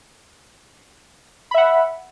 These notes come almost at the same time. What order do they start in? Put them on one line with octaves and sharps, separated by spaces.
B5 E5 F#5